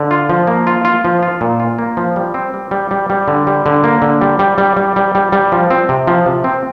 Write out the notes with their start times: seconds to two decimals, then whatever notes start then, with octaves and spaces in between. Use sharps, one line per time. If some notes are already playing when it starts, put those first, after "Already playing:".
Already playing: D3
0.11 F4
0.29 F3
0.47 A#3
0.67 F4
0.85 F4
1.05 F3
1.23 F4
1.41 A#2
1.60 F4
1.79 A#3
1.97 F3
2.16 G3
2.34 C4
2.54 G3
2.71 G3
2.91 G3
3.10 G3
3.28 D3
3.47 G3
3.66 D3
3.84 A#3
4.02 D3
4.21 G3
4.39 G3
4.58 G3
4.77 G3
4.96 G3
5.15 G3
5.32 G3
5.52 F3
5.70 C4
5.89 C3
6.07 F3
6.26 C3
6.44 C4